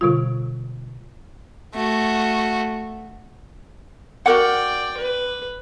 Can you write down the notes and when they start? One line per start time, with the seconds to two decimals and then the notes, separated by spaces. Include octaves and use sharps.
0.01 B2 D3 G3 F4
1.75 A3 F#4
4.26 F#4 A#4 D5 F#5 G5
4.97 B4